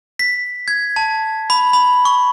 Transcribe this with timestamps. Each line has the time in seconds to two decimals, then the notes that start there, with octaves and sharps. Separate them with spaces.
0.19 B6
0.68 G#6
0.96 A5
1.50 B5
1.73 B5
2.05 C#6